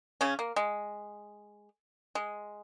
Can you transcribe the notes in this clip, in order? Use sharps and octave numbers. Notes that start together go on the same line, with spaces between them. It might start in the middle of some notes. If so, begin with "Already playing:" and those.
C#3 C#4
A#3
G#3
G#3